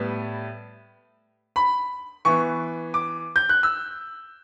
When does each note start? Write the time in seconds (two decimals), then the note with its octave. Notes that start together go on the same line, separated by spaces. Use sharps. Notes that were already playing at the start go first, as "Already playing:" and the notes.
Already playing: A2 G3 B3
1.56 B5
2.25 E3 B3 C#6
2.94 D6
3.36 G6
3.49 F#6
3.63 E6